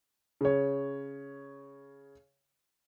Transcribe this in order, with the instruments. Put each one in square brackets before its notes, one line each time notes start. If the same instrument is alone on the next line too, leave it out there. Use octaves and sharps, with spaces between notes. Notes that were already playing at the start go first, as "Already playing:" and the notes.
[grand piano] C#3 C#5